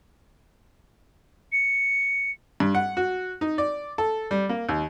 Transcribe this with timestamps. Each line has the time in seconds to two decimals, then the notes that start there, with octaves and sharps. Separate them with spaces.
1.52 C#7
2.60 G2
2.75 F#5
2.97 F#4
3.41 D#4
3.58 D5
3.98 A4
4.31 G3
4.49 A#3
4.69 D#2